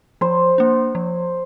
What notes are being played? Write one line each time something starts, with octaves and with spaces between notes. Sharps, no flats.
F3 C5
A#3 D4
F3